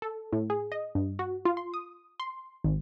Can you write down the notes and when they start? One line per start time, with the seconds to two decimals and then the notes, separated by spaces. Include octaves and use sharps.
0.02 A4
0.33 A2
0.50 G#4
0.72 D#5
0.95 G2
1.19 F#4
1.45 F4
1.57 C6
1.74 D#6
2.20 C6
2.64 G#1